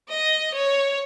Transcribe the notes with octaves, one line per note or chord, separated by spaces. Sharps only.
D#5
C#5